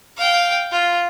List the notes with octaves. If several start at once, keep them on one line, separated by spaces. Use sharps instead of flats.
F5 G5
F4